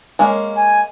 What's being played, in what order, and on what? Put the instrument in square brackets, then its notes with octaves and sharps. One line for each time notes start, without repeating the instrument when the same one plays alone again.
[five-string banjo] G#3 A#3 C#4
[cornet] G#5